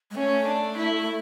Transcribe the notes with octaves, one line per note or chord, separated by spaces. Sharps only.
G#3
A3 C#4
D4
E4